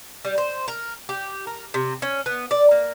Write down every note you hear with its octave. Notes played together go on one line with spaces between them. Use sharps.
G3
C5
A#4
G4
A#4
C3
C#4
B3
D5
A#3